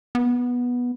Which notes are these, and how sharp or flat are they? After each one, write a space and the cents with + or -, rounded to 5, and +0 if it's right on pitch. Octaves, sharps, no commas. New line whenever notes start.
B3 -10